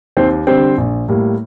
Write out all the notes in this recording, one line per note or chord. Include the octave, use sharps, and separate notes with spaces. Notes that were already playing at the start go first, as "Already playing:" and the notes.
D#2 C4 C5
D3 G3 C4 C5
A#1
A2 G3 A#3